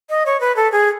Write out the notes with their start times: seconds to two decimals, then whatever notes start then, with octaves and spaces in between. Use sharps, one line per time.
0.10 D#5
0.26 C#5
0.40 B4
0.56 A4
0.72 G#4